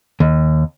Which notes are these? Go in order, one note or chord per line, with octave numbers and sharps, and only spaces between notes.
D#2